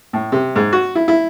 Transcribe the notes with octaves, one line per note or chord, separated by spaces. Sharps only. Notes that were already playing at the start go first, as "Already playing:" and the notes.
A2
C3
G#2
F#4
E4
E4